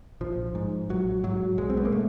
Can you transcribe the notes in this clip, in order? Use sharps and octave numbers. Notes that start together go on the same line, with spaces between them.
A#1 F3
G#2
A#1 F#3
G#2 F#3
B1 G#3
C4
B3
A#3
B2 A3